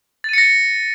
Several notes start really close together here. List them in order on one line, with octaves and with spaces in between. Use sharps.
A6 D#7 C#7 A#6